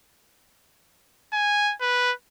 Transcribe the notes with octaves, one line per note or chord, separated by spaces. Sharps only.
G#5
B4